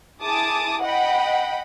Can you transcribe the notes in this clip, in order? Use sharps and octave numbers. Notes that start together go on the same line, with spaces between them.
E4 G#4 A5 D6 D#6
D#5 F#5 G5 B5